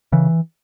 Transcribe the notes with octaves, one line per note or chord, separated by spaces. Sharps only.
C#3 E3